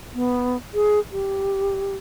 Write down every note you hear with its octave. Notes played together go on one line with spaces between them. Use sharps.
B3
G#4
G4